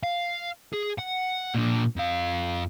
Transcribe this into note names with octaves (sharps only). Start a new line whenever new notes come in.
F5
G#4
F#5
A#2 D4
F2 F5